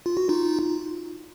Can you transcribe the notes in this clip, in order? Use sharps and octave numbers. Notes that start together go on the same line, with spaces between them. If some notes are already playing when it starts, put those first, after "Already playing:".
F4
F#4
D#4 F4